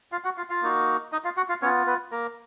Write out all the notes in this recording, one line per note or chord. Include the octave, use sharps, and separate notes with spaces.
F4 F5
F#4 F#5
F4 F5
F4 F5
A#3 D#4 F#4
D#4 D#5
F4 F5
F#4 F#5
F4 F5
B3 C#4 F4 C#5
B3 B4
A#3 A#4